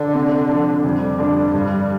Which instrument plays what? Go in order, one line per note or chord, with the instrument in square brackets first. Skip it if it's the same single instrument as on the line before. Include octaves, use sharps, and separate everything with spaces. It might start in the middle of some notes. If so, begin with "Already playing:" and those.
Already playing: [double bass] D3
[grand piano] C3
F3 D4
[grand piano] F2 [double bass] G3
[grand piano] D3 F3 D4
G2